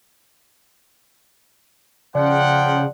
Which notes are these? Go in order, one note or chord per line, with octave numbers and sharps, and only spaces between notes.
C#3 F3 D5 F#5 G5